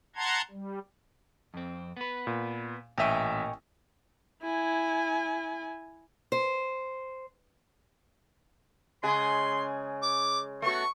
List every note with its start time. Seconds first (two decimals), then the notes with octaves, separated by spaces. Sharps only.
0.16 F#5 A5 A#5 C6 G#6
0.51 G3
1.54 F2 C4
1.97 B3 B4
2.27 A#2
2.98 A1 A#2 A#4 D#5 E5 G5 G#5 C#6
4.43 E4 G#5
6.32 C5
9.03 C#3 G#3 G#4 C6
10.02 D6
10.62 A3 B3 F#4 C#6